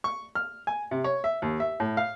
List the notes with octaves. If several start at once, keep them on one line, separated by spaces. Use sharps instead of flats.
C#6
F6
G#5
C3
C#5
E5
D#2
E5
A2
F5